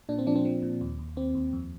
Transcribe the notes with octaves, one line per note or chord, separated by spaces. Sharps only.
A#2 D4
C4
F3 D4
C4
F3
A#2
D#2
D#2
D#2 C4
D#2
F2